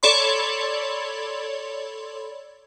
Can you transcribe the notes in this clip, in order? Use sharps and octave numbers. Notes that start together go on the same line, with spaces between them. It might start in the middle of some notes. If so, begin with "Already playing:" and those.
A4 C#5 D5 B5 C6